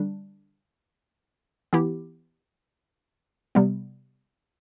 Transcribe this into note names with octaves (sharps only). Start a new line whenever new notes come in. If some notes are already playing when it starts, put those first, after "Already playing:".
Already playing: D3 G3 D4
E3 B3 E4 G4
C3 G3 B3